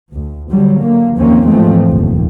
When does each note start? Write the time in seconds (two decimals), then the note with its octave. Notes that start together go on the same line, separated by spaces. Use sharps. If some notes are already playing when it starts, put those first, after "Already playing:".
0.13 D2
0.49 D3 F#3 G3
0.80 D3 A#3
1.17 D#2 F3 A#3 C4 C#4
1.47 G#2 E3 F3 G#3 A3 C4
1.88 F1 A#1 D#2